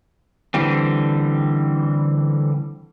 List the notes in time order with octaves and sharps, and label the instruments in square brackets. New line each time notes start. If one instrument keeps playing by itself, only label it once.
[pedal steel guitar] D3 E3 G3 C4